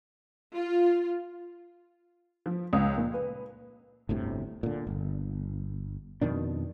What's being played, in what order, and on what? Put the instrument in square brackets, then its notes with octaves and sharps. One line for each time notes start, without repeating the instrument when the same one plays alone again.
[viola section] F4
[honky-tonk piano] F3
C#2
A#2
B4
[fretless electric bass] G1 D2 A2 C3
A#2 D3
G1
F2 B2 D#3 D4